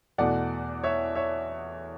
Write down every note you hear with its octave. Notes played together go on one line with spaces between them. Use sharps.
E2 B2 A3 D5 F#5
C#5 E5
C#5 E5